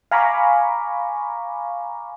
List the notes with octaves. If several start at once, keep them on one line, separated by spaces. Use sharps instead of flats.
F5 G#5 A#5 B5 C#6 D6